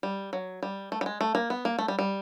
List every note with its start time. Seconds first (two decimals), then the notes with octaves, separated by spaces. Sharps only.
0.03 G3
0.33 F#3
0.63 G3
0.92 A3
1.01 G3
1.06 G#3
1.21 A3
1.35 A#3
1.50 B3
1.65 A#3
1.79 A3
1.88 G3
1.99 G3